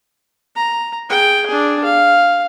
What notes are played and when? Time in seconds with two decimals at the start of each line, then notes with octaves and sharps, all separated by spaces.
0.56 A#5
1.09 G#4 G5
1.47 D4 G#4
1.85 F5